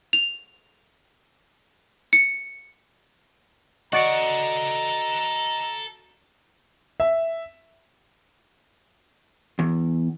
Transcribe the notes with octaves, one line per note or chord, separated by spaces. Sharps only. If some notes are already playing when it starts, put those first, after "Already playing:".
F7
C#7
F#4 A4 D5 D#5 F#5 A#5 C#7
E5
E2